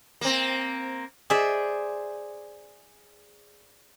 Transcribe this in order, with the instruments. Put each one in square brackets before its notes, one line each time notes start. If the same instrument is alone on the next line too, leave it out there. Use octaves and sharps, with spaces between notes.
[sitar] A#3 C4
[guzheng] G#4 C5 D5 E5